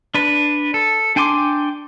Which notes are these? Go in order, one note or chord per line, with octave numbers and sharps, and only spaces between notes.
D4 B4
A4
D4 G5 G#5 C6 D6